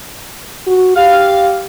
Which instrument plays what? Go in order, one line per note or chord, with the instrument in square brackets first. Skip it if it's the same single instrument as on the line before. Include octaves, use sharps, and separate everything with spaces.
[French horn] F#4
[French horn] G4 [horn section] F5